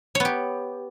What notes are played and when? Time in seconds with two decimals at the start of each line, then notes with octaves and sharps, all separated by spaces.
0.15 C#5
0.20 B3
0.25 G4